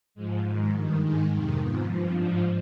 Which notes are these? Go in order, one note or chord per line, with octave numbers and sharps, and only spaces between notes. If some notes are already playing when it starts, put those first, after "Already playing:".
G#2 F3 G#3
G#2 D#3
G2 D#3
G#2 D#3 G#3
F2 C3 D#3
G#2 F3 B3
G2 F3 C4
G#2 F3 D4